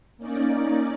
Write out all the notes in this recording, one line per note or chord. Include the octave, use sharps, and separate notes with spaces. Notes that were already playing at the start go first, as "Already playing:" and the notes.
A#3 C#4 D#4 D5